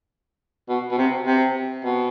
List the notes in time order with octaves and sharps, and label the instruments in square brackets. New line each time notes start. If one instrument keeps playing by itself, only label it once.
[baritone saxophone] B2
B2
C3
C3
B2